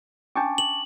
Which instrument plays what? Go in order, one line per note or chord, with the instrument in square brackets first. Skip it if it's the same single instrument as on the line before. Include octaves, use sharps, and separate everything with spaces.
[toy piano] C#4 D4 [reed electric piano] A5 C#6 D6
[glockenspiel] F#7